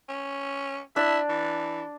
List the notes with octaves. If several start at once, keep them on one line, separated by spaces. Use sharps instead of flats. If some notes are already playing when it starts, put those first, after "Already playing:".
C#4
D4 E4
E3